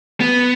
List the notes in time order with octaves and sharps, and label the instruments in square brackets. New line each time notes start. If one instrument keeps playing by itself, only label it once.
[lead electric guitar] B3